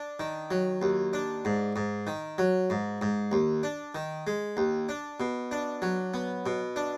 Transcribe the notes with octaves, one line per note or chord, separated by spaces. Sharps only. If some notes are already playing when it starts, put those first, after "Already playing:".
Already playing: D4
D#3
F#3
D#2
D4
G#2
G#2
D#3
F#3
G#2
G#2
D#2
D4
D#3
G#3
D#2
D4
B2
D4
F#3
B3
B2
D4